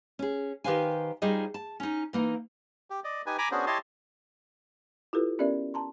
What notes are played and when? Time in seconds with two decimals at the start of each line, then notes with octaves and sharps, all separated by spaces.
0.19 C#4 G#4
0.64 D#3 G4 B4 C5 F5 G#5
1.22 G3 D#4 F4 G#4 C5 D#5
1.54 A5
1.80 C#4 D#4
2.13 E3 A#3 D#4
2.90 G4
3.04 D5 D#5
3.26 D#4 G4 B4 G#5
3.38 G#5 A#5 B5 D6
3.52 B3 C#4 D4 F#4 G#4 C5
3.67 E4 G4 C#5 D#5 A5 C6
5.13 E4 F4 G4 A4 B4
5.39 B3 C#4 G4 A#4 D5 E5
5.74 A5 A#5 C6